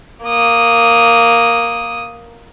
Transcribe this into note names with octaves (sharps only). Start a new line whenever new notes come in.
A#3 D#6